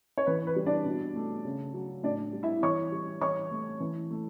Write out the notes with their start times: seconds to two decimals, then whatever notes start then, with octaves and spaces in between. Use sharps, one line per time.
0.17 C#5
0.26 E3 B4
0.47 B4
0.56 G3
0.66 D4 D5
0.86 B2
1.15 A3
1.45 C#3
1.74 F#3
2.03 A2 D4 D5
2.33 G3
2.43 E4 E5
2.63 E3 C#5 C#6
2.92 G3
3.21 E3 C#5 C#6
3.51 A3
3.80 E3
4.11 A3